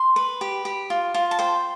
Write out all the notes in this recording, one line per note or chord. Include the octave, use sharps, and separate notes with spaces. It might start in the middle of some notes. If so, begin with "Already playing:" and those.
Already playing: C6
B4
G4
G4
F4
F4
A5
C5 G5